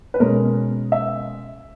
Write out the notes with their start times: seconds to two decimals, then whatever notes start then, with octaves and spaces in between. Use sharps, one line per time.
0.14 B4
0.20 B2 G#3 C#4 A#4
0.92 E5